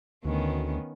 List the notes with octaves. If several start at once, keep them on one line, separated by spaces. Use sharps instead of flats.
D2 D#3 B3 C#4